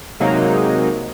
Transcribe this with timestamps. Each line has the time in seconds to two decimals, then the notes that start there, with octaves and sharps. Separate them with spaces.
0.20 C3 F#3 G#3 A#3 D#4